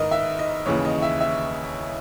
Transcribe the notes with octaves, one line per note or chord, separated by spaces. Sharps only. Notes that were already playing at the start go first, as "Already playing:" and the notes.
Already playing: G#2 D#3 A#4 B4 D#5
E5
D#5
D#2 C#3 E3 C#5
D#5
E5
E5